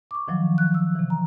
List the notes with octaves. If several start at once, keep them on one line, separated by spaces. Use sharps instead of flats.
C#6 D6
D#3 F3 F#3
F#6
E6
C3 E3
A#5